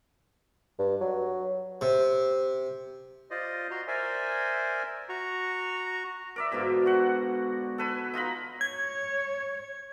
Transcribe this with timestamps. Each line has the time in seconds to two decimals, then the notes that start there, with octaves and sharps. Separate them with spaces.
0.79 G2
1.01 F#3
1.81 C3
3.31 F4 C5 D5 D#5
3.71 F#4 A#5 C6
3.88 A#4 C5 D5 E5 G#5
5.09 F#4 A#5 C#6
6.36 A#4 D5 E5
6.52 G#2 B2 D3 F4
6.86 F#4 F#5
7.78 A4 B4 G#5
8.14 D#4 F4 A#5 B5
8.61 C#5 G#6